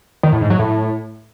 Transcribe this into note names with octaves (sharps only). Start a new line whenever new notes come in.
D#3
A2
G#2
F#3
A2